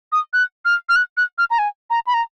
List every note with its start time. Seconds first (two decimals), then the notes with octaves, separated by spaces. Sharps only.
0.12 D#6
0.33 F#6
0.65 F6
0.89 F6
0.96 F#6
1.17 F#6
1.38 F6
1.50 A#5
1.59 G#5
1.90 A#5
2.07 B5
2.14 A#5